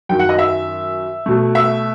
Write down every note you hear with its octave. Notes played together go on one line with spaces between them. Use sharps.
F#2 D#3 F#3 G5
F#5
D#5
E5
B2 A3
E5